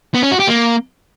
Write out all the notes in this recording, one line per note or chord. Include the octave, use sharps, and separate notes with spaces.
B3
C#4
F#4
G4
A#3